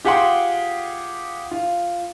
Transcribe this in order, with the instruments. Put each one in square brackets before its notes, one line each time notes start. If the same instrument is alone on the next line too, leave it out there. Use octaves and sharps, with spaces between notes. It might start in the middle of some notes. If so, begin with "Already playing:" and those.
[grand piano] F4 G4 G#4 F#5 G5 C6
F4